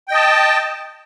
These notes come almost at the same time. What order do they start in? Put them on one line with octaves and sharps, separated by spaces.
G5 D#5 A5